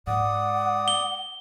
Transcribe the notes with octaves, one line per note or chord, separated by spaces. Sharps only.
G#2 G#3 D5 F#5 D#6
G7